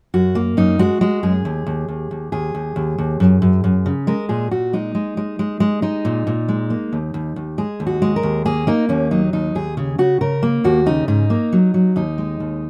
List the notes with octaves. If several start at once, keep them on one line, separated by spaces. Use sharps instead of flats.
F#2 F#4
A#3
F#2 D#4
G#3 F#4
G#3 F#4
F#2 G#4
D#2
D#2
D#2
D#2
D#2 G#4
D#2
D#2
D#2
F#2
F#2
F#2
C#3
G#3 A#4
A#2 G#4
A#2 F#4
G#3 D#4
G#3
G#3
G#3
G#3
G#3 D#4
A#2
A#2
G#3
A#3
D#2
D#2
D#2
G#3 G#4
D#2
F#4
G#3
A#4
D#2
A#3 G#4
A#3 D#4
D#2 C#4
F#3 D#4
D#2 D#4
D#2 G#4
C#3 G#4
C#3 F#4
C#3 A#4
A#3
D#2 F#4
C#3 D#4
G#2 D#4
A#3
F#3
F#3
D#2 D#4
G#3
D#2